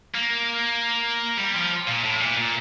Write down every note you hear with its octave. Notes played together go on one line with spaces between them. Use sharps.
A#3
G3
F3
A#2
A2
A#2
A#2